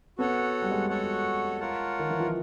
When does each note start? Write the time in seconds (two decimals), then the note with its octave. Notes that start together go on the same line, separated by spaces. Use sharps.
0.18 B3 F#4 A4 C#5 F#5
0.62 G3
0.71 G#3
0.89 F#4 A4 C#5 F#5
1.60 F4 A#4 C#5 F#5 A5
1.99 D#3
2.10 E3
2.20 F3